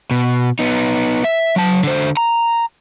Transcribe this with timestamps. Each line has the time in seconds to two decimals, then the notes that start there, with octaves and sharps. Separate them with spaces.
0.11 B2
0.59 B3 D#4
1.24 E5
1.56 F#3 A5
1.83 D3 C5
2.17 A#5